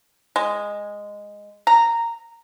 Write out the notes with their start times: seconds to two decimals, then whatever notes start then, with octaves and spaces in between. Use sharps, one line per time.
0.36 G#3
1.67 A#5